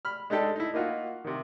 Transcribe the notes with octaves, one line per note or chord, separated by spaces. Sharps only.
B5 F6
G#3 D4 D#4 G4 A4
D#4 E4
A#3 D#4 F4 F#4
C3 D#3